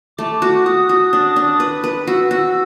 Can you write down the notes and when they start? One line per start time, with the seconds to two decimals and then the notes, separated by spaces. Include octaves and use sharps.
0.18 A3 D6
0.42 F#4
0.65 F#4 D#6
0.89 F#4
1.13 D4
1.36 D4
1.60 B4
1.84 B4
2.07 F#4 E6
2.31 F#4